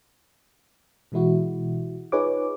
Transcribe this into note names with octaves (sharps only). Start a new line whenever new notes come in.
B2 E3 G#3 E4 F#4
D#4 F4 G#4 B4 C#5 D6